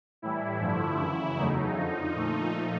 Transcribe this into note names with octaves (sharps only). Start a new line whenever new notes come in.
A2 E3 G3 E4
G2 D3 F3 A3
F#2 C#3 E3
E2 C#3 F#3 A3 D#4
F2 D3 F3
A#2 F3 A3